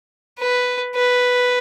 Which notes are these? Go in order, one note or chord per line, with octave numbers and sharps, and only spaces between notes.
B4
B4